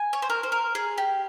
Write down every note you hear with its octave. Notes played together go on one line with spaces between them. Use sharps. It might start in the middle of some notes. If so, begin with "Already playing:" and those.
Already playing: G#5
C#5
C5
A#4
C5
A#4
G#4
G4